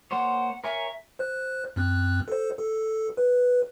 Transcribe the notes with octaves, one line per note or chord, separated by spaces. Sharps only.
A#3 C5 C#5 F#5
A#4 C#5 E5 G#5
C5 F#6
F#2 C4 F#6
A4 C5
A4
B4